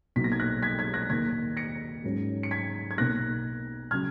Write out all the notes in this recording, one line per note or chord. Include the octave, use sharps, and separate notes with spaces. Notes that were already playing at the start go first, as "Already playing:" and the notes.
B1 A#2 F#3 B3 D#4 B6
A#6
G#6
F#6 A#6
G#6 B6
G#6 B6
F#6 A#6
D#2 D#3 A#3 D#4 G#6 B6
A#6 C#7
G#2 F#3 C#4
C#7
G#6 B6
G#6
B1 B2 A#3 D#4 F#6 A#6
C#3 F#3 F6 G#6